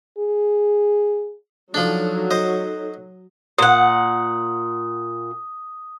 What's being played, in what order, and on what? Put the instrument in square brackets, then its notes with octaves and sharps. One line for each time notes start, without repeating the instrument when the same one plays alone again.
[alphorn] G#4
[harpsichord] F3 D4 [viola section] F#3 [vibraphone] D#4 A4
[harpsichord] C5 D#5
[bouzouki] A#2 F#5 [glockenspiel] D#6